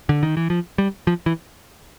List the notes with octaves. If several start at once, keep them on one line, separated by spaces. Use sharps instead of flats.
D3
D#3
E3
F3
G3
F3
E3